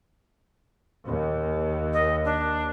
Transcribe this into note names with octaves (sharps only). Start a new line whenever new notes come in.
D#2
D#5
D4